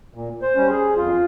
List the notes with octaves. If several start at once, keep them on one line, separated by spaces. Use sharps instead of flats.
A#2
C5
G3 C#4
G#4
F2 F4